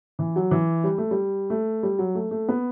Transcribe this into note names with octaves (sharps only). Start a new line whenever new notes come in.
E3
F#3
E3
G3
A3
G3
A3
G3
F#3
A3
A3
B3